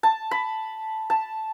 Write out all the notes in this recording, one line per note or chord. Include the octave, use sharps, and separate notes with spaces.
A5
B5
A5